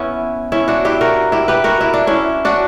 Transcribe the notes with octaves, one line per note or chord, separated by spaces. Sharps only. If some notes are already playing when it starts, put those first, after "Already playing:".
Already playing: B3 C#4 E4
C#4 E4
D4 F#4
E4 G4
F#4 A#4
E4 G4
G4 B4
F#4 A#4
E4
D4
C#4 E4
D4 F#4